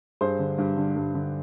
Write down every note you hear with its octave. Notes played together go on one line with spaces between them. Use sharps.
G2 G#4 C5
D3
G2
D3
G2
D3